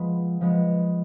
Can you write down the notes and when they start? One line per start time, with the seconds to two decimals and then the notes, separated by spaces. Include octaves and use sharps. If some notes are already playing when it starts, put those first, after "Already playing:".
Already playing: F3 G#3 B3 B5
0.41 F3 G#3 B3